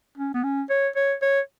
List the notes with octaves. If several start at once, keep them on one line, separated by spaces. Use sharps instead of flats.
C#4
B3
C#4
C#5
C#5
C#5